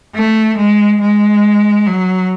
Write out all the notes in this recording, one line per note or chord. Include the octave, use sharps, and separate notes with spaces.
A3
G#3
G#3
F#3